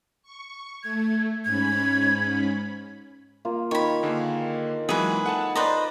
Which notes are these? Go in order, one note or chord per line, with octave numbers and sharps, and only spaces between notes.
C#6
A3 G#6
G#2 C#4 B5 G#6
A#3 F4
D#3 C#5 B5
D3 A#3 G#4
E3 F#3 G#3 G#4 B4
A4 F#5 G#5 A5
B4 C5 D5 D#5 A#5